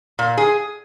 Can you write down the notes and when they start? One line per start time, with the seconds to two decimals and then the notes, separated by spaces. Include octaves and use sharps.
0.19 A#2
0.37 G#4